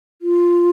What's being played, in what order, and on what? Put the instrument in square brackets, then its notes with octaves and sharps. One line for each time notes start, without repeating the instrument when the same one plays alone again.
[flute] F4